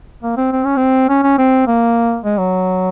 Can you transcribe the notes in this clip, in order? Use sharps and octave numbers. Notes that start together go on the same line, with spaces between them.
A#3
C4
C4
C#4
C4
C#4
C#4
C4
A#3
G#3
F#3